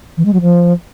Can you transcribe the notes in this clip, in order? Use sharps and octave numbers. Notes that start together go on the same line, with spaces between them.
E3
G#3
F#3
F3